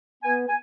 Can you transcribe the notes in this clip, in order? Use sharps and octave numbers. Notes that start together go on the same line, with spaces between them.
B3 G#5
G#5